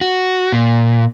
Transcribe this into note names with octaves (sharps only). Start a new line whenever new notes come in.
F#4
A#2